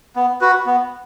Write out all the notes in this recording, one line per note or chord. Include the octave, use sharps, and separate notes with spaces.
B3
F#4 B4
B3